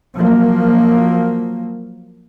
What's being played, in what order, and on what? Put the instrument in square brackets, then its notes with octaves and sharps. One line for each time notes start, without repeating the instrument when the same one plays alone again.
[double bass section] F3 F#3 A#3